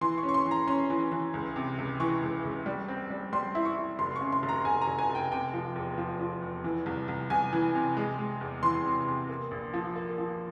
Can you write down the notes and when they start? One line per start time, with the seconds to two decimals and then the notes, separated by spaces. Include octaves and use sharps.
0.01 E3 C6
0.18 C#6
0.23 C#4
0.29 C#6
0.34 C6
0.45 E3
0.51 A#5
0.67 C#4 C6
0.90 E3
1.12 E3
1.34 C#2
1.56 C3
1.78 C#2
2.00 E3 C#6
2.22 C#2
2.44 C#2
2.66 G3
2.88 C4
3.10 G3
3.33 G3 C6
3.55 E4
3.65 C#6
3.76 E4
3.99 F1 C6
4.16 C#3 C#6
4.32 C6
4.43 F1
4.49 A#5
4.65 F1 G#5
4.81 A#5
4.87 F1
4.99 G#5
5.10 F1
5.15 G5
5.32 C3 G5
5.54 F3
5.76 E2
5.98 F3
6.20 F3
6.42 E2
6.64 E3
6.86 C2
7.08 C2
7.30 C2 G#5
7.53 E3
7.75 C3
7.97 G#3
8.19 G#3
8.41 E2
8.63 E3 C6
8.85 C3
9.07 C3
9.29 A#3
9.51 A#1
9.74 F3
9.96 A#3
10.18 F3